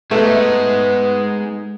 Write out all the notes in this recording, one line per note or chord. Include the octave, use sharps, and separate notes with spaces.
G#3 A3 B3 D#4